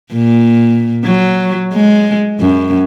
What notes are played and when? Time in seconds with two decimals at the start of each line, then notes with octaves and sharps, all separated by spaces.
0.13 A#2
1.04 F#3
1.74 G#3
2.40 F#2